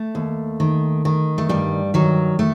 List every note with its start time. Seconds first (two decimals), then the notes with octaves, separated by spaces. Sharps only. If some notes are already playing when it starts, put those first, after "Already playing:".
Already playing: A3
0.15 D#2
0.60 D#3
1.05 D#3
1.38 A3
1.49 G2 G3
1.94 D#3 F#3
2.39 A3